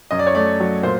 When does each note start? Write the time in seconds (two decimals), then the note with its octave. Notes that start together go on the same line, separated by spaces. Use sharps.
0.11 F#2 D#5
0.19 D5
0.27 C#5
0.35 A3 D5
0.60 F#3
0.83 A#2 C5